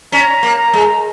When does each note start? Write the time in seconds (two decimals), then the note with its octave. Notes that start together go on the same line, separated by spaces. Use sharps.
0.12 C#4 A#5
0.43 A#3
0.58 A#5
0.73 G#3